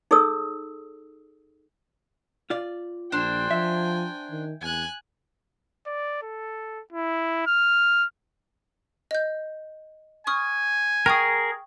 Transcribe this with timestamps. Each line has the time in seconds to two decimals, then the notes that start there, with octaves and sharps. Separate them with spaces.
0.11 D#4 G#4 A4 C#5 D#6 E6
2.50 F4 D5
3.12 A#1 D4 C5 G5 G#5
3.51 F3 E5
4.31 D#3
4.61 E2 G#5 F#6
5.86 D5
6.22 A4
6.92 E4
7.47 F6
9.11 D#5 G6
10.27 G#5 C#6 D#6 F6
11.06 G#4 A#4 G5 C#6 D#6